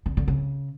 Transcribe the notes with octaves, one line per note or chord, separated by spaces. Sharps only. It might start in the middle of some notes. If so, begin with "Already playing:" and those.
D3
D3
C#3